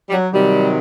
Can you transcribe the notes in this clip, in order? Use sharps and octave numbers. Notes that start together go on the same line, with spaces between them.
G3
F#3
C3 D#3 F#3 G3